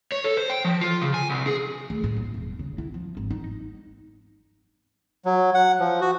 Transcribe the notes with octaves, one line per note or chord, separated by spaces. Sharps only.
C#5
A4
C5
G5
F3
F4
C#3
G#5
C2
G#4
D2
A2
D#1
E1
C#3
E4
F3
G#1
D#4
F#3
F#5
F3
F#4